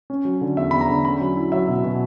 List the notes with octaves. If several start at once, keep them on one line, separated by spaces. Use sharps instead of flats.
C#4
F#3
D3
E2 E5
E2 B5
A#5
D3
C#4 B5
F#3
E4
F#3 E5
B2
B2